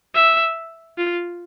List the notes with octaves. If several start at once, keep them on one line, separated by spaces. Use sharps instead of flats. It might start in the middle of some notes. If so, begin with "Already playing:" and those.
E5
F4